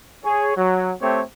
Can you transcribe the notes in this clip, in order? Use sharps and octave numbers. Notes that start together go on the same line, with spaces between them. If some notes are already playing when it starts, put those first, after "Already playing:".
G#4 C#5
F#3
A3 C4 G4 C#5